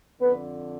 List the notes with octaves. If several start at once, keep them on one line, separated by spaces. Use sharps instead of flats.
F2 D3 B3 B4